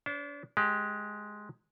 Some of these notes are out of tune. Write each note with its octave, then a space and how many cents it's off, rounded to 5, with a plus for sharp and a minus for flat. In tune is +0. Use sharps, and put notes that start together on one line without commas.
D4 -40 C5 +0
G#3 +10 G4 +0